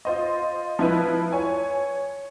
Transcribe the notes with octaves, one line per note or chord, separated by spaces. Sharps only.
F4 C5 D#5
F3 E4 B4
C#5 G#5